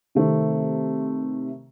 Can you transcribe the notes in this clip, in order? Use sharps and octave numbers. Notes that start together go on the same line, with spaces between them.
C3 D#3 A3 C4